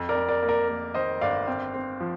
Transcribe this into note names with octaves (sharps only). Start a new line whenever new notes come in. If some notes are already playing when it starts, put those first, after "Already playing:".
Already playing: F2
A#4 D5
F2
A#4 D5
A#3
A#4 D5
A#3
D#3 C5 D#5
G1 D5 F5
C4
C4
F3